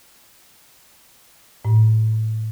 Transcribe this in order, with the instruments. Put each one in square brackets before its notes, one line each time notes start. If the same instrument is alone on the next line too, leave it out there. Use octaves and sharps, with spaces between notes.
[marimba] A2